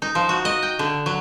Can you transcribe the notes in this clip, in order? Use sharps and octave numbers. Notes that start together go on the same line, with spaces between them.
D#4
F3
F#4
D#5
G5
D3
F#3